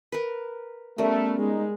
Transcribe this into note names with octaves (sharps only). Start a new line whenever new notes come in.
A#4 B4
G3 A3 B3 C#4 A#4
G#3 D#4